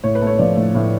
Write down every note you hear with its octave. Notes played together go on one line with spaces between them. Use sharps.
A2 C#5
B4
A3 C#5
F3 B4 D5
A2
A2